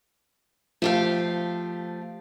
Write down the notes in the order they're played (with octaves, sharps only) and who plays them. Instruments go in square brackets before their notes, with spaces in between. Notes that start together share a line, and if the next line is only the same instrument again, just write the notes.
[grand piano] F3 [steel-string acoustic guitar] A3 G4 F5